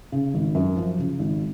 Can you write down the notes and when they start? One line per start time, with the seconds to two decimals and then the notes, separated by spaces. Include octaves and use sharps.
0.12 C#3
0.34 G#1
0.55 F#2
0.77 F3
0.98 C#3
1.19 G#1